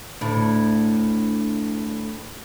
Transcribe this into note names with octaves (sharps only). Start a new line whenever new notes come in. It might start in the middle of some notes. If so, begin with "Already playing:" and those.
D2 A2 D4